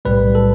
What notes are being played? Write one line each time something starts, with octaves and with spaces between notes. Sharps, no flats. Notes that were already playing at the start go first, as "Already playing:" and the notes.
B1 A2 G3 B4
A4